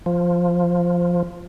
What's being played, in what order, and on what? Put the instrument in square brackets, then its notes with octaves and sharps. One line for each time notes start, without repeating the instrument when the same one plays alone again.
[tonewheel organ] F3